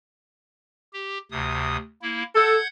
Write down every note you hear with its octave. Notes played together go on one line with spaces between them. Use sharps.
G4
D2 C3 D#6
A#3 E4
A4 F#5 G6 G#6